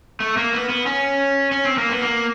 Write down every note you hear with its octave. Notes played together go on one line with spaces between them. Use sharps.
A3
A#3
B3
B3
C#4
C#4
C4
A#3
B3
A#3